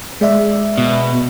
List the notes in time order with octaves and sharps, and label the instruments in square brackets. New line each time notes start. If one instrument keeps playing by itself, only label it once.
[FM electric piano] G#3 D5 E5
[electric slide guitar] B2